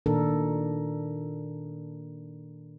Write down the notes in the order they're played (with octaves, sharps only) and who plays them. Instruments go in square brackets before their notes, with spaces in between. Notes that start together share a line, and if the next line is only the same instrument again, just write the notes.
[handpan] A#2 D#3 D4 A4 A#4